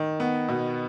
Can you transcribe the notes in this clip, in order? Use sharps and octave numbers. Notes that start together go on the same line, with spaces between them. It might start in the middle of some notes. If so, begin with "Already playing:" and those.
Already playing: D#3
B3
B2